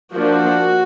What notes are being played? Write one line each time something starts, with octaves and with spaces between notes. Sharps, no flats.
F3 A#3 D4 F#4